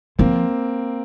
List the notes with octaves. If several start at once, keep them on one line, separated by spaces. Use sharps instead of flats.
F3 A#3 C4